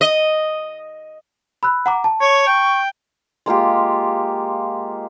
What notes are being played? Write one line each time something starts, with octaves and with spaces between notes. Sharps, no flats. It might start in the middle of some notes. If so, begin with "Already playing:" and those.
D#5
B5 E6 F#6
F#5 A#5 D6
A5
C#5 C#6
G5
G#3 A#3 F4 G4